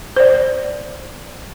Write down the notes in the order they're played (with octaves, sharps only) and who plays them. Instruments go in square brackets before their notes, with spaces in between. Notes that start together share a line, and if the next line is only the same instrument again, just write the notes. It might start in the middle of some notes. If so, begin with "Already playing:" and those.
[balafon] C5 D5